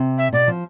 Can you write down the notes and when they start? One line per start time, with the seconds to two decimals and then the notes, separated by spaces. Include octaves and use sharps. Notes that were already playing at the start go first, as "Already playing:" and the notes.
Already playing: C3
0.18 E5
0.33 B2 D5
0.47 F3